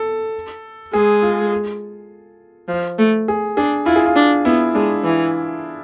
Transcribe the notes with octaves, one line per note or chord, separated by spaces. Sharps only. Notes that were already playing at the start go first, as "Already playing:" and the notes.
Already playing: A4
G#3 G#4
F4
F3
A3
G#4
D4 G#4
E4 F4
G#4
F4
D4
B3 E4
G#3 D4
E3